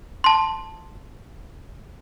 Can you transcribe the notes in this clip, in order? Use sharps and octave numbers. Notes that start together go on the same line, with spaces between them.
A5 C6